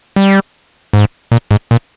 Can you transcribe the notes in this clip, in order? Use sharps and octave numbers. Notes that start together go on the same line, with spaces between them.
G3
G#2
A#2
G#2
A#2